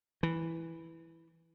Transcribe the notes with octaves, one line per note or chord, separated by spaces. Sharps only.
E3